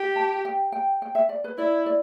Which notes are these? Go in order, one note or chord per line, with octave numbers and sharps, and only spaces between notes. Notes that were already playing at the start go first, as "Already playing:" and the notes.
Already playing: G4
A5
G5
G5
G5
E5
D5
B4
E4 D5
D5